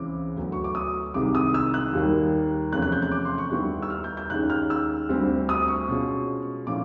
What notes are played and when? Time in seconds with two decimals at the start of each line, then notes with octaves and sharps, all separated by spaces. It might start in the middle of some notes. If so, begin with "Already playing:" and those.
Already playing: C#2 C#3 E3 G#3 C4 D6
0.36 D2 D3 F#3 B3
0.52 C#6
0.64 D6
0.75 D#6
1.14 C2 C3 D#3 G#3 D6
1.35 D#6
1.54 E6
1.74 F#6
1.93 D#2 D#3 G3 A#3
2.72 E2 C3 F3 A3 C#4 F#6
2.82 F#6
2.92 G6
3.02 F#6
3.12 D6
3.25 C6
3.38 C#6
3.51 D#2 D3 G3 B3 E4
3.82 E6
3.90 F6
4.04 G6
4.17 G6
4.30 D#2 D#3 G#3 C#4 F#6
4.50 F6
4.70 E6
5.09 D2 D3 G3 C4
5.49 D#6
5.68 C#6
5.88 B2 G#3 C#4 F4
6.67 A#2 F3 A3 C#4 E4 D6